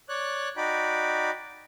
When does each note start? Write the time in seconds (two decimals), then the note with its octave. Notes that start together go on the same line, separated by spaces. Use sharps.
0.09 C#5 D5 F#6
0.57 D#4 F#4 D5 G5 B5